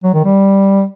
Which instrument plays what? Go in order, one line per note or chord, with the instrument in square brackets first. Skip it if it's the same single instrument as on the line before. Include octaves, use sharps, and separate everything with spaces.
[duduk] F#3
D#3
G3